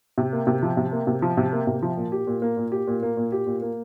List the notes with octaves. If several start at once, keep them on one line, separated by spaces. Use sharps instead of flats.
C3
A#3
C3
F3
C3
A#3
C3
F3
C3
A#3
C3
F3
A#2
G4
A#2
A#3
A#2
G4
A#2
A#3
A#2
G4
A#2
A#3